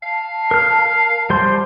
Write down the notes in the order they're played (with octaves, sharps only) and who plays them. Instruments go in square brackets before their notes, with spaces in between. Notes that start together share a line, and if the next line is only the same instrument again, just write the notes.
[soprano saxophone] F5 [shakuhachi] A5
[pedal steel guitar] A#4 F6
G3 C5 C6